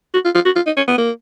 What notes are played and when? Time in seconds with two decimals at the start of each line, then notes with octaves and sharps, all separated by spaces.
0.14 F#4
0.25 F4
0.35 F4
0.45 F#4
0.56 F4
0.66 D#4
0.77 C#4
0.88 B3
0.98 A#3